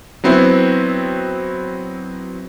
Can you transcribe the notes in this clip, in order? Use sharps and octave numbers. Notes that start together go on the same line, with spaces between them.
F#3 B3 C4 E4